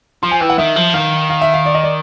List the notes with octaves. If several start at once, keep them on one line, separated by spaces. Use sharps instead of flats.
F3 C6
G#5
E3 G5
F#5
D#3 E5
F3
D#3 F5
F5
E5
F5
D5
D#5
D5